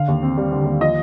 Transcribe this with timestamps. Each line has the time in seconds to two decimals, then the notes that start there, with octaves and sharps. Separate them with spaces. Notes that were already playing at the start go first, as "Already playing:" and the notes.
Already playing: D3 F5
0.08 D#2
0.23 C4
0.37 G3
0.52 D3
0.66 D#2
0.81 F3 D#5